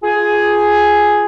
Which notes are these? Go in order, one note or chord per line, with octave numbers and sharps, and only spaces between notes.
F4 G#4 G#5